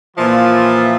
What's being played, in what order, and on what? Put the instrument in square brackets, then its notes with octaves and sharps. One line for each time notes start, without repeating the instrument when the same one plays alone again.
[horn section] A#2 E3 F3 F4 E5